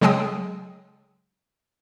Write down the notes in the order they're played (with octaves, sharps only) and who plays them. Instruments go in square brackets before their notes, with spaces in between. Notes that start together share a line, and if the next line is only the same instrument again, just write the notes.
[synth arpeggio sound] C#3 F#3 G#3 G#4 G5 D#6